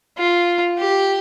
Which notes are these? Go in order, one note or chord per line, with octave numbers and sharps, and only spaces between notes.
F4
G4